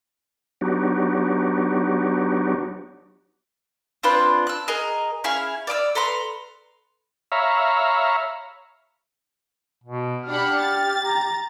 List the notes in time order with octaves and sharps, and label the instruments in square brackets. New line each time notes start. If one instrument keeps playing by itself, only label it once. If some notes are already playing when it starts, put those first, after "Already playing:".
[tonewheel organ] F#3 B3 D4 D#4 F#4 G4
[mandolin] C4 D4 F4 B4
E6 F#6
G#4 A#4 D#5 A#5
C#4 E4 G#4 F5
D5 F5 D6 E6
A4 B4 A#5 C6
[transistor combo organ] C#5 E5 F5 A#5 B5
[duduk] B2
[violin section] D4 F#5 B5 [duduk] G4 [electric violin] F6
[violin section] A6
[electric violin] A#5